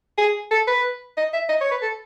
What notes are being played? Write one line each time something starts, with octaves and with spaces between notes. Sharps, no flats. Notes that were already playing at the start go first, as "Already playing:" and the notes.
G#4
A4
B4
D#5
E5
D#5
C#5
B4
A4